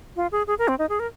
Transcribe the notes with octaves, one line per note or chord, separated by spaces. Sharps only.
F4
G#4
G#4
A#4
C4
D#4
G#4
A#4